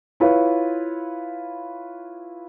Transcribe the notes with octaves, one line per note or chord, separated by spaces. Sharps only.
E4 F4 B4 C#5